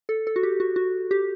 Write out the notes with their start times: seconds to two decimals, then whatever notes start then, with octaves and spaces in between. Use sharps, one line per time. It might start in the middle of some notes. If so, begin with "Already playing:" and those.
0.09 A4
0.27 A4
0.36 F#4
0.43 G4
0.60 F#4
0.76 F#4
1.11 G4